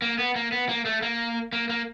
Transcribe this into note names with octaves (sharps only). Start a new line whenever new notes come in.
A#3
B3
A#3
B3
A#3
A3
A#3
A#3
A#3